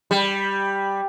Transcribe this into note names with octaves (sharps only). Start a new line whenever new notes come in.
G3